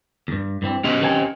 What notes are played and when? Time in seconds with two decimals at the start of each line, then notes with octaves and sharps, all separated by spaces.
0.28 E2 G2
0.62 G2 E3 C4
0.84 B2 C#4 G4 D#5
1.01 D#3 C4 G#5